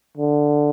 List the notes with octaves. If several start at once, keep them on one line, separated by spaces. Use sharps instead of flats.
D3